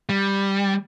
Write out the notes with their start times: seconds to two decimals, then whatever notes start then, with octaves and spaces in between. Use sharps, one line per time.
0.09 G3